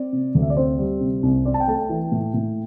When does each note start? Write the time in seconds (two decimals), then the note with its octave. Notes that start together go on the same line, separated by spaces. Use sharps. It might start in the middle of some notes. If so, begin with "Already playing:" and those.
Already playing: C4 D5
0.13 C3
0.35 D2
0.42 E5
0.50 D5
0.57 C4 C5
0.79 G3
1.01 C3
1.23 C2
1.45 C4 D5
1.54 A5
1.60 G5
1.68 A3 A5
1.75 G5
1.90 E3
2.12 A2
2.34 A2